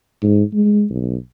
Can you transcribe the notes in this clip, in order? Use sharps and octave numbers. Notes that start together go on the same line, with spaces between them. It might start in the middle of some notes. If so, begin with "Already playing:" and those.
G#2
G#3
B1